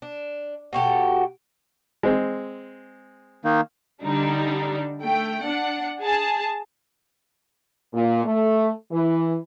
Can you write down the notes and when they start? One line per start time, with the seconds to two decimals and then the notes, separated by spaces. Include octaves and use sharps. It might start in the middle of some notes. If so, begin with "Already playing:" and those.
0.02 D4
0.73 B2 F#4 G4 A4
2.03 G#3 C4
3.45 D#3 A#3 D#4
4.02 D3 G3 D4 D#4
5.03 A3 G5
5.45 D4 F#5
6.01 G#4 A5
7.94 A#2
8.25 A3
8.92 E3